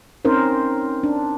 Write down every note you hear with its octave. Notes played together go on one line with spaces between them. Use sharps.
C4 C#4 D#4 A#4 C5
D4